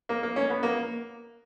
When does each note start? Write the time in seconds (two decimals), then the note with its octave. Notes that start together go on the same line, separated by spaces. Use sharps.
0.09 A#3
0.23 A#3
0.36 C#4
0.50 B3
0.63 A#3